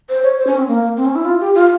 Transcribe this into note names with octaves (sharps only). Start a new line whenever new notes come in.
C5
C#5
C5
C#4
C4
A#3
C4
C#4
E4
F4
G4
F4